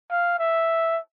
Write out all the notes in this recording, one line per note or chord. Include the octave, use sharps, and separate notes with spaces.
F5
E5